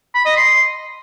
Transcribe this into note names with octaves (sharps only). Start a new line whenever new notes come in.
B5
D#5
C6